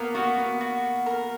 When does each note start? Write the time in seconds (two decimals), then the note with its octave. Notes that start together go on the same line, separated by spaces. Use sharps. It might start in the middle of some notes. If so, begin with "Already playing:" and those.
Already playing: A#3 B3 A#4
0.15 B3 F#4
0.38 B3
0.61 F#4
1.06 A#4